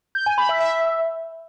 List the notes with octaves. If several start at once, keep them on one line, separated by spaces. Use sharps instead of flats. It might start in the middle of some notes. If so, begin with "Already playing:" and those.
G6
G#5
B5
E5
E5